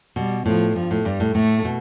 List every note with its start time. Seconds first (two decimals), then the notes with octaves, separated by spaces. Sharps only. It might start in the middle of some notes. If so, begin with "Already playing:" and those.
0.16 B2 G3
0.46 A2 F3
0.75 G2 F3
0.91 A2
1.05 G2 G3
1.20 A2
1.35 A2 A3
1.65 B2